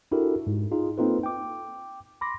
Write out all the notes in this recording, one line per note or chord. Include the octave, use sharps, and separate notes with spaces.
D4 E4 F#4 G4 A4 A#4
G#2
D#4 F4 G#4
A#3 C4 D#4 F4 A4 B4
G5 D6
B5 C6 D6 A#6